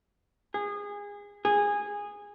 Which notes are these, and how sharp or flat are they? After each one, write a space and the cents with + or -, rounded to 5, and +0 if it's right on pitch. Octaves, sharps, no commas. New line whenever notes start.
G#4 -25
G#4 -15